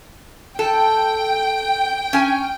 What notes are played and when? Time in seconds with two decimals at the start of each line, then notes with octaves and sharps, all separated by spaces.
0.59 A4 G5
2.13 C#4 G#5